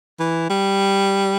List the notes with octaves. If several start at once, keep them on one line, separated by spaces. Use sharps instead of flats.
E3
G3